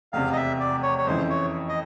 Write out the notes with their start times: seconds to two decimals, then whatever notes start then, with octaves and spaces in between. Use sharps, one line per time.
0.13 F1 E2 C3 F5
0.32 D#5
0.36 E5
0.60 D5
0.83 C#5
0.98 C#5
1.06 F2 C#3 E3 C5
1.30 C#5
1.69 D#5